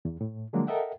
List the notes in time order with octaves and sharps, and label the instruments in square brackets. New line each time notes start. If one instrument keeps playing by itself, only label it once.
[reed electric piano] E2
A2
D3 F3 F#3 G#3 A#3 D4
A4 A#4 D#5 E5 F#5 G5